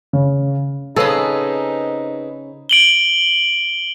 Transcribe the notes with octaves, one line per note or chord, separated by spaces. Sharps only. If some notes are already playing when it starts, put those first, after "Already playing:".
C#3
C#3 C4 D#4 G#4 A4 B4 D#5
D7 F#7 G7